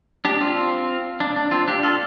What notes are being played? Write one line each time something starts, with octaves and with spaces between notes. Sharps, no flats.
D4 G4
C4 F4
D4
D4
C4 F4
D4 G4
F4 A4